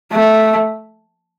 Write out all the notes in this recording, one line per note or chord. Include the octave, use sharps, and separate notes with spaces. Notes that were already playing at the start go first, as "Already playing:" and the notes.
A3